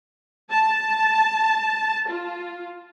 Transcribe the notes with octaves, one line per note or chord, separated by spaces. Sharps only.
A5
F4